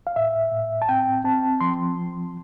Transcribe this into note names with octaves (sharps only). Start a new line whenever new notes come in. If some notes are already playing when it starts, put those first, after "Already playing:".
F5
A2 E5
A2
A5
C4 G5
C4 A5
F3 C6